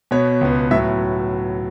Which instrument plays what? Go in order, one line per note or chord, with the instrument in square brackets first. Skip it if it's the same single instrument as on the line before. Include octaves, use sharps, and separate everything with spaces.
[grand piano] B2 B3 C#5
C#2 B2 B3
A2 F#3 B3 E5